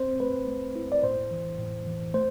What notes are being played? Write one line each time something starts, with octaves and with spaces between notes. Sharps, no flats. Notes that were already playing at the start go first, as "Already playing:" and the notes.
Already playing: C4 C5
A3 B4
A3
E4
D5
A2 C5
E3
A2
E3
A3 C5